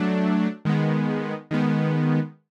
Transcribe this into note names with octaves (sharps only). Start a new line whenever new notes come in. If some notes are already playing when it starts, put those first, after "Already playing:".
Already playing: F#3 A3 D4
D#3 G#3 B3
D#3 G#3 B3